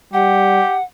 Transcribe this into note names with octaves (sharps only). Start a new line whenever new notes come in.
G3 G4 F#5